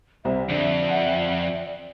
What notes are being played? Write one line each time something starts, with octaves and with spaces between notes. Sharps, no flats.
C2 C5 E5
F2 D3 D5
F#5